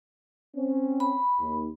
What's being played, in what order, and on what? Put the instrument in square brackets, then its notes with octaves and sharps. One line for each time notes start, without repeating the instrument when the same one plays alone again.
[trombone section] C4 C#4
[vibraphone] B5
[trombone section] D#2